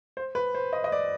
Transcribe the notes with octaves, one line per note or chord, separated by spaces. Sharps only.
C5
B4
C5
D#5
D#5
D5